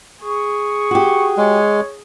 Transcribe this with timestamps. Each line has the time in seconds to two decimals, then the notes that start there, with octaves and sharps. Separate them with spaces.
0.22 G#4 C#6
0.91 F#4 G4
1.37 G#3 C#5